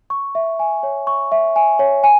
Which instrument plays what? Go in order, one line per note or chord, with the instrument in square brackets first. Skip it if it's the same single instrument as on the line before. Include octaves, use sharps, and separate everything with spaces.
[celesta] C#6
E5
G#5
C#5
C#6
E5
G#5
C#5
G#5